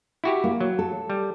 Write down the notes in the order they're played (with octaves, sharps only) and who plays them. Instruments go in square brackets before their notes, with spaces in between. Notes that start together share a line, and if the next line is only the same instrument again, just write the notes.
[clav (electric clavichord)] E4 F#4 G4
[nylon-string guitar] A#3
[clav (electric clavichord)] F#3
[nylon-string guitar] A4
[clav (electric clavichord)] G3